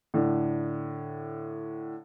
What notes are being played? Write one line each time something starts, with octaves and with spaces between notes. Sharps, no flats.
A2 D3